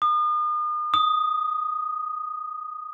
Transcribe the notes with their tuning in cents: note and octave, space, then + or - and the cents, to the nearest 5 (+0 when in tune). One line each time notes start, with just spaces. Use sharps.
D#6 -40
D#6 +0